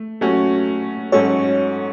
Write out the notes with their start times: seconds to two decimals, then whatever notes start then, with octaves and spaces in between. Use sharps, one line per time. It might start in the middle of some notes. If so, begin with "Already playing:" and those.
Already playing: A3
0.21 F#3 A3 C#4 F#4
1.12 G#2 F#3 C#4 F#4 A4 C#5